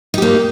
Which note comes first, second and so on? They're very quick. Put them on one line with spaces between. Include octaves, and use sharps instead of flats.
D#4 G4 A#3